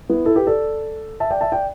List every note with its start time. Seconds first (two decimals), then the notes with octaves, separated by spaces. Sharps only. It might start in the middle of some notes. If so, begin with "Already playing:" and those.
0.10 B3 E4
0.25 E4 A4
0.36 G4 B4
0.47 A4 D5
1.20 E5 A5
1.31 D5 G5
1.41 E5 A5
1.52 D5 G5